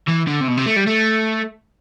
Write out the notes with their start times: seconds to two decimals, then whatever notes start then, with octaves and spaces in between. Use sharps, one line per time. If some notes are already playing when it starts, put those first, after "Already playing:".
0.08 E3
0.27 D3
0.41 C3
0.48 B2
0.57 C3
0.66 A3
0.76 G3
0.87 A3